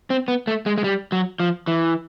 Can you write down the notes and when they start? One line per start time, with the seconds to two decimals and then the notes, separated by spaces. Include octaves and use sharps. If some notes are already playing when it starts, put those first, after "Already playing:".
0.10 C4
0.28 B3
0.47 A3
0.66 G#3
0.78 G#3
0.84 G3
1.12 F#3
1.40 F3
1.67 E3